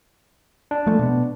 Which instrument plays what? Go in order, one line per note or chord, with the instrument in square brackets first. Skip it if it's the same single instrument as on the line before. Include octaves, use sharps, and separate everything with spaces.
[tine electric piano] D4
[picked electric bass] F3 G#3 A3
B2 B3